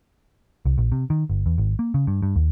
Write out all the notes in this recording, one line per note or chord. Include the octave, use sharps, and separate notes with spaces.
C2
A#1
C3
D#3
G1
E2
G#1
A#3
C#3
G2
G2
D#2